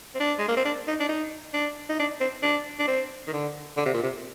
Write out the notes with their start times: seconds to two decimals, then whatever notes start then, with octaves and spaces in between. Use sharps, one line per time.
0.15 C4
0.20 D4
0.38 G#3
0.48 A#3
0.57 C4
0.65 D4
0.88 D#4
1.00 D4
1.09 D#4
1.54 D4
1.89 D#4
1.99 D4
2.20 C4
2.43 D4
2.79 D4
2.87 C4
3.28 D#3
3.33 D3
3.77 D3
3.85 C3
3.94 A#2
4.03 C3